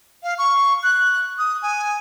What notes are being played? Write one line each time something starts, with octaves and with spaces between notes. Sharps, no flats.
F5
C#6
F#6
D#6
G#5